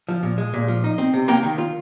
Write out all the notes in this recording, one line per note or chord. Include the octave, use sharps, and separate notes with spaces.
F3
A#2
G#3
A#2
F3
D#4
C4
C3
A#3 G5 A#5
D#3
F4